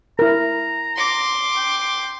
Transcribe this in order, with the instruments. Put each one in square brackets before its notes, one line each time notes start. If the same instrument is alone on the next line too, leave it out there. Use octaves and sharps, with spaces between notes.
[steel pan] E4 A#4 [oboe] A#5
[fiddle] C6 D6
[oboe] G5